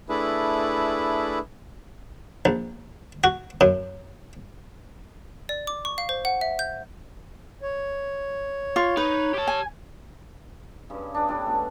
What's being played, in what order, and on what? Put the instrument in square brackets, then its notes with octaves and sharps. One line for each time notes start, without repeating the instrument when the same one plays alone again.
[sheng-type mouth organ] A3 D4 E4 G#4 B4
[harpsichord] A#1
F#4
F#2
[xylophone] D5
D6
C#6
F5
C5
F#5
E5
G6
[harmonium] C#5
[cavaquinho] F4 C#6
[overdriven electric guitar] D#4 [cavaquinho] B4
[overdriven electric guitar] G4 A5
[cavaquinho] G#5
[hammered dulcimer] G2 C#3
D4 G#4
A2 G3 C#4 D4
B2 A3